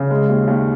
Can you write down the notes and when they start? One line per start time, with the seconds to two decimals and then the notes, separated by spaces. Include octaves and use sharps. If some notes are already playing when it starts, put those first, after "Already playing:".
Already playing: C#3
0.11 G#3
0.29 D#2
0.47 D#2